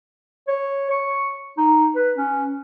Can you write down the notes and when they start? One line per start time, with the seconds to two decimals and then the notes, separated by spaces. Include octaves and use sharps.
0.48 C#5
0.90 C#6
1.57 D#4
1.95 B4
2.17 C#4